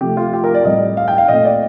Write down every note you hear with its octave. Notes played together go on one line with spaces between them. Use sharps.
C3 F3 A3 G4
F4
G4
A#4
D5
A2 G3 C4 D#5
F5
G5
F5
A#2 A3 C4 D#5
D5